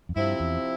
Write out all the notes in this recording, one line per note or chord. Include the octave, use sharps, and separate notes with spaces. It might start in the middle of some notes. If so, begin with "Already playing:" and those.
F2
G2 C3 F3 C4 E4
E2